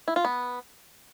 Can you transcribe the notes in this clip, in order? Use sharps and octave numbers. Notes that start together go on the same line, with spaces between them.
E4
F4
B3